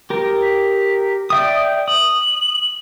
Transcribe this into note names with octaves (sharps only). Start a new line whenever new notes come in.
G4 A#4
B6
D5 E5 G5 D#6
D#6 F#7